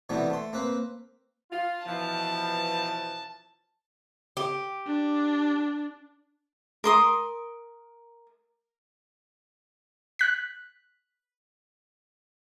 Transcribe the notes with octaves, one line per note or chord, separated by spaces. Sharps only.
C3 E3 G3 A3 B3
A3 C6
A#3 C4 B4
F4
B2 E3 F3 A5
G4
D4
A#4 C6 D#6
F#6 B6